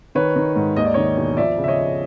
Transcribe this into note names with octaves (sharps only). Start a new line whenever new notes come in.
D#3 B4 C#5
D#3
G#2
D#2 D#5
D5
D#3 C#5 D#5
E1
F3 D5 E5
C#3
E5
C#5 D#5
F3